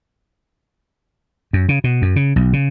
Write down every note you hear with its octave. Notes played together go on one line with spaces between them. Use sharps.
F#2
C#3
B2
F#2
C#3
B1
C#3